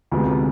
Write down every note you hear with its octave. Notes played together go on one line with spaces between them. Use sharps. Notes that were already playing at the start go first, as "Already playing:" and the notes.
D2 C3 F3 G#3 B3